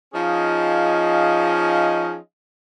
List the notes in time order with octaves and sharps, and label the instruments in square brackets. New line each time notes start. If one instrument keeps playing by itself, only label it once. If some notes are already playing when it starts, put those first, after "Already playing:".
[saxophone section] F3 C#4 D#4 G#4 D#5 F5